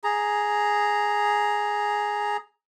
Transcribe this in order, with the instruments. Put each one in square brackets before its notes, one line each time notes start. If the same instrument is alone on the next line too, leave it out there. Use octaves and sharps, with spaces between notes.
[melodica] G#4 A#5